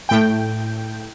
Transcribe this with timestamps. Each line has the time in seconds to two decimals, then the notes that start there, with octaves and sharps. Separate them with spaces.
0.09 A2 G5